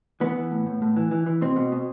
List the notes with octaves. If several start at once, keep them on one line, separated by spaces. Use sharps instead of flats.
E3 B3
E3
A2
A2
A2
E3
E3
E3
B2 C4
B2
B2